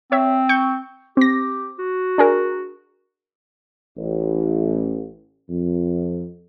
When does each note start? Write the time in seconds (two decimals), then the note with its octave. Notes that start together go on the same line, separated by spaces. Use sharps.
0.12 C4 C#5 E5
0.49 C#6 G6
1.17 C4 G4 A#6
1.79 F#4
2.18 D4 G#4 A#4
3.97 A1
5.49 F2